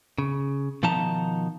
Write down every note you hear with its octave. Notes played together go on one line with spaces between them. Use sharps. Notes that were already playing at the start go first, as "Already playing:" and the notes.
C#3
B2 D#3 F3 D#4 A5 A#5